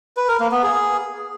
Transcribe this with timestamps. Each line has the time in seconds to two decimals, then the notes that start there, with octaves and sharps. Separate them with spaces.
0.17 B4
0.28 A#4
0.40 A#3
0.52 B3
0.63 G#4